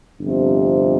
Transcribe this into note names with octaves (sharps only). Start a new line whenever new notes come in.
G1 F2 C3